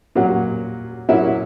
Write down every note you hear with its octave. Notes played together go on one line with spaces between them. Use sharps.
A#2 F#3 A#3 C#4
A#2 F#3 A#3 C#4 E4 E5